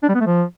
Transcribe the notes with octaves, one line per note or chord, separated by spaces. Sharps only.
D4
G3
B3
A3
F3